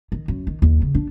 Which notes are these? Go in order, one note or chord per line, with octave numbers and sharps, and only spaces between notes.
D#3
F#2
D#3
D#2
C#3
D4